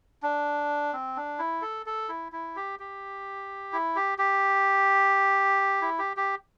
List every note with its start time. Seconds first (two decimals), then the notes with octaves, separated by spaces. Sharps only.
0.23 D4
0.93 C4
1.16 D4
1.39 E4
1.62 A4
1.86 A4
2.09 E4
2.32 E4
2.56 G4
2.79 G4
3.73 E4
3.96 G4
4.18 G4
5.82 E4
5.99 G4
6.17 G4